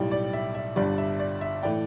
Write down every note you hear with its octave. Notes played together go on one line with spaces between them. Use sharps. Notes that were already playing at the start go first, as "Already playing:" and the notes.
Already playing: B1 A2 G3 D5 G5
D5
E5
E5
G1 G2 G3 D5
E5
D5
E5
A2 E3 A3 D5 G5